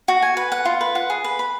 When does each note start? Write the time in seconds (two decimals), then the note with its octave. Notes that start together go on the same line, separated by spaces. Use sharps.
0.08 F#4
0.22 G#5
0.37 B4
0.52 F#5
0.65 F4
0.81 B4
0.95 F#5
1.10 G#4
1.24 B4
1.39 B5